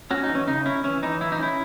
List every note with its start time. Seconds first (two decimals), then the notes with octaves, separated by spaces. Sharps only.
0.11 C#4 F#4
0.23 D#4
0.29 E3
0.35 C#4
0.47 C#3 D#4
0.66 C#4 E4
0.84 E3 C#4
1.03 E3 D#4
1.21 E3 E4
1.32 D#4
1.39 C#4 E4